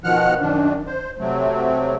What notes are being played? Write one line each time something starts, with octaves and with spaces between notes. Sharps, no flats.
B2 D#3 F3 F#5 F6 F#6
F#2 D#3 D4
C5
C3 F#3 A3 C4